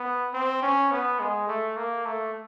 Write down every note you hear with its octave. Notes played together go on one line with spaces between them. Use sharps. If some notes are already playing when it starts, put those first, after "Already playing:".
Already playing: B3
C4
C#4
B3
G#3
A3
A#3
A3